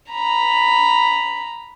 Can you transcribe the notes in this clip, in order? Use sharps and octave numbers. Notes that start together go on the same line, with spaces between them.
A#5 B5